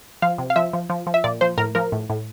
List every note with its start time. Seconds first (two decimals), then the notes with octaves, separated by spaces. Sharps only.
0.22 F3 F5
0.38 C3
0.50 F5
0.56 F3 E5
0.73 F3
0.90 F3
1.07 F3
1.14 E5
1.24 A#2 D5
1.41 F3 C5
1.58 A2 A#4
1.75 F3 A#4
1.92 A2
2.10 A2